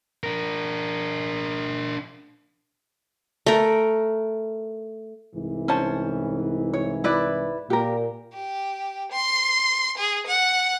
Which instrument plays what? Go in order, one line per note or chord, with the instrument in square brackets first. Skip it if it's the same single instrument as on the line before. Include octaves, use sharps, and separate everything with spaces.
[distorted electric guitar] D4 A#4
[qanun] A3 A#4
[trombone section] C2 G#2 E3
[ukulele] C#4 C5 A5
C#5
E4 B4 D5
[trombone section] A#2 [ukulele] G4 A#4
[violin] G4
C6
G#4
F#5